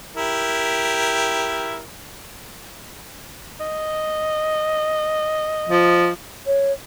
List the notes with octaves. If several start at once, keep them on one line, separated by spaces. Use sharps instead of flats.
E4 G4 A#4
D#5
F3
C#5